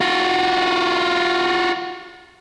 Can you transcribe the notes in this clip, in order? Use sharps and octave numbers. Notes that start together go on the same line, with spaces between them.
F4 F#4